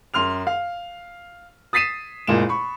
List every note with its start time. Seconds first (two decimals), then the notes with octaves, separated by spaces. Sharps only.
0.14 F#2 C6 F6 F7
0.47 F5
1.73 D#6 A6 B6 C7 D#7 E7
2.27 F#1 A#2 G#3 E7
2.49 B5 C#6